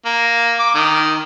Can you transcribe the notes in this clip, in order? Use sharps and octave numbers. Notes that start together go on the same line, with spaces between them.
A#3
D6
D#3